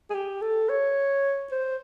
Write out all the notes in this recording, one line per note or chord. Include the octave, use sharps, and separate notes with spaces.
G#4
G4
A4
C#5
C5